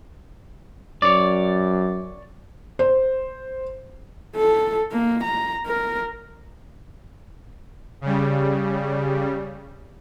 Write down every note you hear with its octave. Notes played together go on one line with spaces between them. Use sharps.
F#2 C#5 D5
C5
A4
A#3
A#5
A#4
C#3 G3